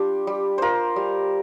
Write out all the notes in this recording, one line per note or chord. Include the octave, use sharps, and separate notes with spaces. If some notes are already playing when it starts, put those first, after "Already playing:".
Already playing: G3 D4 F4 G4
G3
F4 A#4 C5
G3